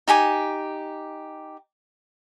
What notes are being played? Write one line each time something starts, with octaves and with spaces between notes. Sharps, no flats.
D#4 G4 G#5 D6